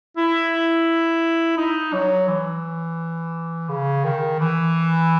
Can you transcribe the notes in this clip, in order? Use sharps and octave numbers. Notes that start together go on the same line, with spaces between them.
E4
D#4
F#3
E3
C#3
D#3
E3